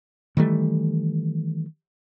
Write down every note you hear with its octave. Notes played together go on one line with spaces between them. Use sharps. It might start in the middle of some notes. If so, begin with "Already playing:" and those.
D#3 E3 G3 A3